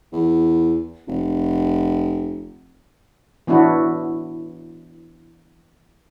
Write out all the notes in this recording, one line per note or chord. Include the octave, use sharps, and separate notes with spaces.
E2
F1
E3 B3 D4 E4 F#4